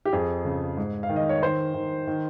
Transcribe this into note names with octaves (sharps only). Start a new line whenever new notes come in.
G4
F2 G#4
C#3
G#2
F5
D#3
D#5
C#5
D#3 C5
D#3
D#3